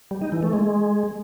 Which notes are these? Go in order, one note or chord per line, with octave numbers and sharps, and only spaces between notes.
G3
D#4
E3
A3
G#3